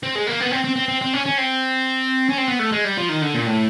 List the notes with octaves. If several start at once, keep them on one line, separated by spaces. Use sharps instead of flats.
C4
G#3
A#3
B3
C4
C4
C4
C4
C4
C#4
C#4
C4
C#4
C4
B3
A3
G#3
G3
F3
D#3
D3
A#2
A2